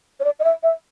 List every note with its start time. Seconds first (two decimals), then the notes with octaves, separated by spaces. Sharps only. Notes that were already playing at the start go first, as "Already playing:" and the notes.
0.20 C#5
0.24 D5
0.40 D#5
0.44 E5
0.63 E5